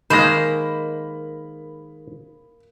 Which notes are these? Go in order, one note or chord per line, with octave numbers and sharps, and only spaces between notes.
D#3 G#3 A#3 C5 B5 A#6